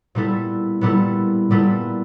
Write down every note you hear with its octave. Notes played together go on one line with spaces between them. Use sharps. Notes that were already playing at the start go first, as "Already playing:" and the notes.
A#2 G3 B3 E4 A4
A#2 G3 B3 E4 A4
A#2 G3 B3 E4 A4